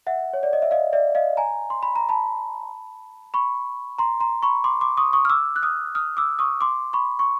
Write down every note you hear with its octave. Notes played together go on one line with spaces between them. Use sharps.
E5 F#5
C#5
D5
D#5
E5
D#5 F5
D5 E5
D#5 F5
G#5 A#5
C6
B5
A#5
A5 B5
B5 C#6
A#5 C6
A#5 C6
B5 C#6
C6 D6
C6 D6
C#6 D#6
C#6 D#6
F6
D6 E6
F#6
D#6 F6
D#6 F6
D6 E6
C#6 D#6
C6 D6
B5 C#6
C#6